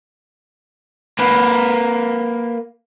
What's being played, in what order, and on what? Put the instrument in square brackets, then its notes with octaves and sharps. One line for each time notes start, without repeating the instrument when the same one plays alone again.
[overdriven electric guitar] A#3 B4